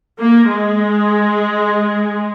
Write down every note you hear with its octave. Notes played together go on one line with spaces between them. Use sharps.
A#3
G#3